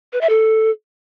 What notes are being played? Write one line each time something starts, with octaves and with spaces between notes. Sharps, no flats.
B4
E5
A4